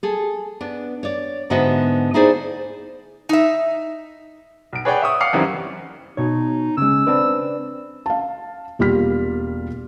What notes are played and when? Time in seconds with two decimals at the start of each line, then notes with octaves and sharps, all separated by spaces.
0.03 G#4 A4
0.61 B3 D4
1.03 C#5 D5
1.50 G#2 D3 B3 F#4 D#5 E5
2.14 D#4 E4 G#4 A4 C5 D5
3.29 D#4 E5
4.73 B1 D7
4.85 G#4 B4 C#5 D5 F#5 G5
5.02 E5 C#6 D#6
5.20 F5 F#5 D6 F6 C7 C#7
5.33 F#2 D#3 E3 G3 C4
6.17 B2 D#4 C#5
6.77 C#3 G#3 E6
7.07 C4 D4 B4
8.06 F5 A5
8.79 E1 G3 A#3 F4 F6 B6